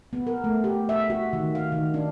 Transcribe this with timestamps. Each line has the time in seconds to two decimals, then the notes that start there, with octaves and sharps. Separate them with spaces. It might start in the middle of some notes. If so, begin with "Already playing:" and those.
0.13 B3
0.27 A#4
0.44 A3
0.64 G4
0.89 E5
1.10 F#4
1.33 D#3
1.55 F5
1.72 D#3
1.94 D4